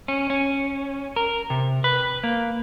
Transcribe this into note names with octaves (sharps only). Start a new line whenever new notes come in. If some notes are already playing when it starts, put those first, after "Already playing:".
C#4
C#4
A#4
C3
B4
A#3